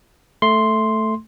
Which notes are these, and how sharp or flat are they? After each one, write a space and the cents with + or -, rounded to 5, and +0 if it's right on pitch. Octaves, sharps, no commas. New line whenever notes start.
A3 +0 C6 +0